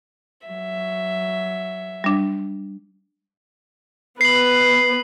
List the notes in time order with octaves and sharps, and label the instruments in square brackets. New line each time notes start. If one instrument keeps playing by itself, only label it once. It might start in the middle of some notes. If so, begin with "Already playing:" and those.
[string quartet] F#3 E5
[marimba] G3 D4
[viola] B3 B4 [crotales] C7 F#7